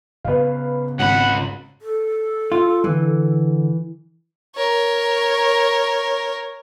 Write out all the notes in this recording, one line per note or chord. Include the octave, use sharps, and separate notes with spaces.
C#3 B3 B4 F5
G#1 C#2 F#5 B5
A4
F4
D3 E3
A#4 C#5